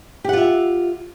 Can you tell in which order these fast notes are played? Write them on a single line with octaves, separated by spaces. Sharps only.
G4 F#5 F4 E5